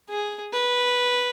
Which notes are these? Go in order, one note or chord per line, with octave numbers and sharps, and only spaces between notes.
G#4
B4